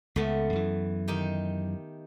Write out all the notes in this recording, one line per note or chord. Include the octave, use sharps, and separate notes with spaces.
C#2 C#3 A3 B3
F#2 E3
D#3 D#4 G4